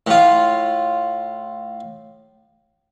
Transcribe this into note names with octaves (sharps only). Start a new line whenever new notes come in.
A2 F4